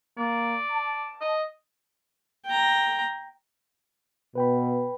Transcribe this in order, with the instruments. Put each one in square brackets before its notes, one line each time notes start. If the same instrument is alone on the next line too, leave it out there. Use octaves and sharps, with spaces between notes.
[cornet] A#3 [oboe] D5
[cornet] A5
[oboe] D#5
[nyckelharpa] G5 A#5
[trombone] B2 [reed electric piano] B4 G5 B5